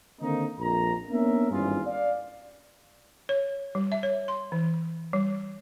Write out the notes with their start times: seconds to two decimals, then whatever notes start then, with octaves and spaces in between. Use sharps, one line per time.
0.21 D3 D#3 A#3 C4 D#4
0.59 A#1 F2 A#5
1.10 A#3 B3 C#4 D4 A#4 E5
1.51 G#1 G2 E3 C#4 F4 G#4
1.87 D5 F5
3.29 C#5
3.75 G3
3.92 E5
4.03 C#5
4.28 C6
4.52 E3
5.13 G3